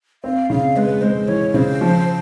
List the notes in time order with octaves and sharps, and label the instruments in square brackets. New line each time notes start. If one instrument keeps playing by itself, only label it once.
[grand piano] C4 [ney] F5
[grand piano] C#3 [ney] F5
[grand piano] G#3 [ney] B4
[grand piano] G#3 [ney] C5
[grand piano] E3 [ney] C#5
[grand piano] C#3 [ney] C5
[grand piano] F3